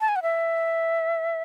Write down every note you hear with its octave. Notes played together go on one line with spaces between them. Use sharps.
A5
G#5
F#5
E5